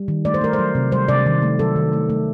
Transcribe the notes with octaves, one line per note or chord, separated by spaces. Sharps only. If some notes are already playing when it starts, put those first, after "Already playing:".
Already playing: G3
D#3
A3 D5
C5
A3 A#4
C5
F#3
C3
G3 C5
C3 D5
D#3
A3
F#3 A4
D#3
A3
A3